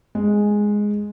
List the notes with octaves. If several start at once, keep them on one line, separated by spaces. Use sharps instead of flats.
G#3